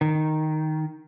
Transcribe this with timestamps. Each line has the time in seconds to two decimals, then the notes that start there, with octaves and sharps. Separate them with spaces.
0.01 D#3